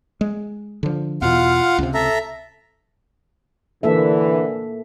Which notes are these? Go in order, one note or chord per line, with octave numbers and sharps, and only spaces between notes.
G#3
D3 F3
E2 B2 F4 F5 F#5
C#2 C3
A4 E5 A#5
D3 E3 A#3 A4 E5